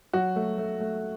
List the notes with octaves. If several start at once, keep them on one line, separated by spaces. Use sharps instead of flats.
F#3 F#4
A3
A3
A3